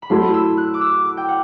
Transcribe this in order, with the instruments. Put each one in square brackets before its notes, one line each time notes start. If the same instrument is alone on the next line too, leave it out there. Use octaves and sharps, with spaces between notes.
[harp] B5
[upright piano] F#3 A3 E4 [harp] C6
[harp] E6
F#6
D6
E6
D6
G5
F#5